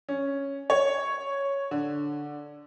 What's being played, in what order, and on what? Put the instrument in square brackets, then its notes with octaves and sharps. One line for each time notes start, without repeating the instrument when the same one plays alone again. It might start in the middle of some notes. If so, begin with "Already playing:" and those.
[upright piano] C#4
C#5
D3